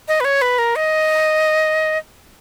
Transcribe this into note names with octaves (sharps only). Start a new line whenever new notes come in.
D#5
B4
C#5
B4
A#4
D#5